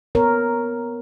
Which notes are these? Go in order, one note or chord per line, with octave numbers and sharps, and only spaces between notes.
B3 A#4 C#5